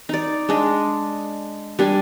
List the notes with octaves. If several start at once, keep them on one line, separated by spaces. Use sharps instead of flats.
D#4 D5
G#3 D4 D#5
G3 D4 G#5